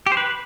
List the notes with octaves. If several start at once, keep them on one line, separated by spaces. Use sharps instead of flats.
G4
C5
B4